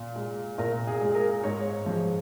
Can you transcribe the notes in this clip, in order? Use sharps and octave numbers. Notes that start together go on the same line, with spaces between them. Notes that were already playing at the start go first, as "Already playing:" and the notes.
Already playing: A#2
G#3
A#2 A#4
G#4
G#3
A#4
G#2 C#5
F3 G#3